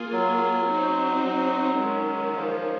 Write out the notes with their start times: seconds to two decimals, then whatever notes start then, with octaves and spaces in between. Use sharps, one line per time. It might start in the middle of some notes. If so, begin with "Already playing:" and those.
Already playing: A#3 F4 G#4
0.13 F#3
0.68 C4 D#4 F#4 C5
1.24 F#3
1.79 D#3 G#3 C#4
2.35 F3